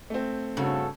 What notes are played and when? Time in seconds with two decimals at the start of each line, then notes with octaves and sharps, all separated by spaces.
0.10 A3 C4
0.57 G2 C#3 C#4 F#4 A4